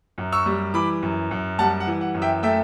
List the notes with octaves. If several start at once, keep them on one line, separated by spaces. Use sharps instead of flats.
F#2
C#6 E6
G3
E3 B5 D6
F#2
F#2
G3 F#5 A5
F#5
E3
F#5
F#2
E5 G5
A3 E5 G5